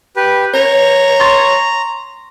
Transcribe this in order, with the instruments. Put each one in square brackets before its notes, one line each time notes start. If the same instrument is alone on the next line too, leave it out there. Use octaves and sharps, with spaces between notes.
[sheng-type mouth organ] G4 B4
[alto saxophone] C#5 [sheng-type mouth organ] A#5
[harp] C6 C#6 A6